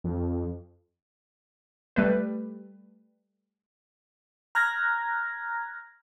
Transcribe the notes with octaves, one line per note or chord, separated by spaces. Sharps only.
F2
G3 A3 B4
A#5 F6 F#6 G#6 A#6